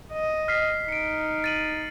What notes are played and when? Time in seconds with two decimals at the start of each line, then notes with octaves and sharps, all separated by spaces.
0.13 D#5
0.48 F6 B6 C7
0.89 D#4 C#7 D7
1.44 A6 D#7 F#7